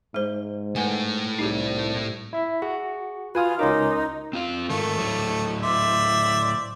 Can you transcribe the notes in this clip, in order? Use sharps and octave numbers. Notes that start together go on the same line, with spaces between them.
G#2 G#3 C5
A2 A3 B4 F#5 G#5
C2 D#4 G4 G#4
E4 E5
F#4 G#4
F4 F#4 B4 G#5 D#6
C#2 C#4 D#4 A#4 C6 D6
C4 F4 F5
G#2 D#3 A3 A#4
A2 F#3
C5 D5 E5